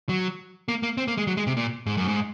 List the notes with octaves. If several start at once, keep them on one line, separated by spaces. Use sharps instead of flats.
F#3
A#3
A#3
C4
A#3
G#3
F#3
G#3
C3
A#2
G#2
F#2
G#2